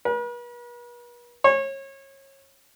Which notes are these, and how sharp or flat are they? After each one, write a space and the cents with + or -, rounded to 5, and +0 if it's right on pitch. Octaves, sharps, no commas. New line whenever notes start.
B4 -45
C#5 -30